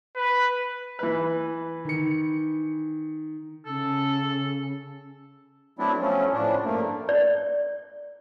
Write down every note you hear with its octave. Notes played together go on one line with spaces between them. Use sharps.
B4
E3 B4
D#3 C#7
C#3 A4
F#3 A3 B3 C4 D4 E4
F3 F#3 A3 C#4
A2 C#3 F3 D4
G2 A3 A#3
D5